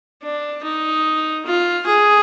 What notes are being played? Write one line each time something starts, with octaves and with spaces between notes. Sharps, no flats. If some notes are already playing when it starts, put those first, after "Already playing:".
D4
D#4
F4
G#4